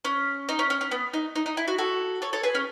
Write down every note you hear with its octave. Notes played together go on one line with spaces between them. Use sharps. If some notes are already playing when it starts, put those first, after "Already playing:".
C#4
D#4
C#4
C#4
C#4
B3
D#4
D#4
D#4
E4
F#4
F#4 A4
A4 C#5
A4 C#5
G#4 B4
C#4